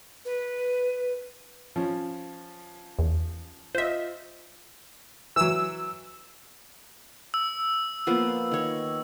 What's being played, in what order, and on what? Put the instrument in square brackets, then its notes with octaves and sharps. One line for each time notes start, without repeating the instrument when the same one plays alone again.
[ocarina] B4
[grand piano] F3 C#4
[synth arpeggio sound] E2
[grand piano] F4 D#5 [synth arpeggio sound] C5 E5
[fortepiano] E3 F#3 [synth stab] E6
[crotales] E6
[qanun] F3 A#3 B3
D#3 C#5